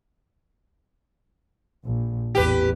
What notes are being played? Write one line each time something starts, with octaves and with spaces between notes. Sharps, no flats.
A#1
A1 E2 G4 B4